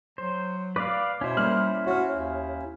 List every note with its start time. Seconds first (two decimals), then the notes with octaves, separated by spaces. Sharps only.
0.18 F#3 C5
0.76 B4 D5 F5 D6
1.21 B2 C#4 E4 C5
1.37 G3 A#3 F6 F#7
1.86 F#4 C#5 F6
2.13 D#2